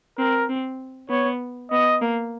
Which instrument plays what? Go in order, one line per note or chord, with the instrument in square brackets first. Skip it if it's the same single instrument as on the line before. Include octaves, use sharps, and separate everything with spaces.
[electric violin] C4 [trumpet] A#4
[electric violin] C4
[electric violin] B3 [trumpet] C#5
[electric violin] B3 [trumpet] D#5
[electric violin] A#3